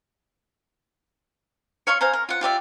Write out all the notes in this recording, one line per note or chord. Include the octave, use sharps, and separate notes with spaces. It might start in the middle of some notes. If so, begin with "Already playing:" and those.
C#5 F5 C6 C#6
C5 F5 G#5 A#5
A#4
F4 F#5
F4 G4 D5 E5